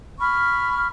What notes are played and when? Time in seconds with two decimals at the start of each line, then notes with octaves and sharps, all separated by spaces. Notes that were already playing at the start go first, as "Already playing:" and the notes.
0.19 B5 C#6 F6